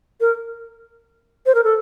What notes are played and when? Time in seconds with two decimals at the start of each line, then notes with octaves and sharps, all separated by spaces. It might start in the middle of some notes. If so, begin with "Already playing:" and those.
0.21 A#4
1.46 C5
1.55 A#4
1.64 A4